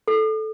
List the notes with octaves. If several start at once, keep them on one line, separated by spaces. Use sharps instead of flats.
A4